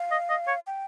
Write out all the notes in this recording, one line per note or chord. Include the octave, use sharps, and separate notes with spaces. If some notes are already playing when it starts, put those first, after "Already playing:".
Already playing: F5
D#5
D#5
C#5
G5